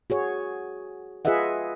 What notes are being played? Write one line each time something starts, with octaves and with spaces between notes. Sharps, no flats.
F#4 G#4 C#5
F4 G#4 B4 D#5 E5 F#5